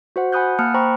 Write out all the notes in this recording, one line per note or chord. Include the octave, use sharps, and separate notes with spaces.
F#4 C5 F#5
F#5 G#5 B5 D#6 F#6 G6
A#3 A5 D#6 F6 F#6 C#7
C5 G5 A#5 B5 C#6